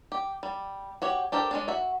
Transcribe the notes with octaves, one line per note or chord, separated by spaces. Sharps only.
G4
G3
F#4 G4 C#5
D4 G4 A4 A#4 C5
G#3 C#4 D4
F#4 E5